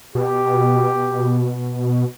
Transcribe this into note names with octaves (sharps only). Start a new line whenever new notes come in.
B2 G4